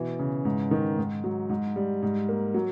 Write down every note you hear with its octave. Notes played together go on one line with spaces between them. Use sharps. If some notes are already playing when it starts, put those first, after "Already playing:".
Already playing: B2 E3
C#3
G#2
D#3
G#2
F#3
G#2
G3
G#2
A#3
F#3